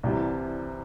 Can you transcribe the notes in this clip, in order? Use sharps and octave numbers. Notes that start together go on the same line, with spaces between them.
C2 C3 E3 G3